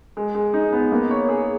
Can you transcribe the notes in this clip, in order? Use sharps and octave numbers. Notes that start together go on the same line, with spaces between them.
G#3
G#3
D#4
B3
A#3
C#5
G#4